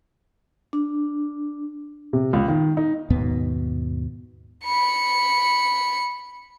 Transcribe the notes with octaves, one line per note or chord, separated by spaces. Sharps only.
D4
C3
C#2
D#3
D#4
D#2 G#2 B2 B3
B5 C#7